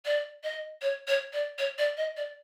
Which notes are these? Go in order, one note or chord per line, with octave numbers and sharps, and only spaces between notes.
D5
D#5
C#5
C#5
D5
C#5
D5
D#5
D5